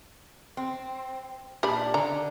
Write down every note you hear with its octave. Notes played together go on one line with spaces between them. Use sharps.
C4
A#2 D4 G4 D5 B5
D3 A#5